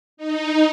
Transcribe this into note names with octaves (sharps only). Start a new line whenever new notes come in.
D#4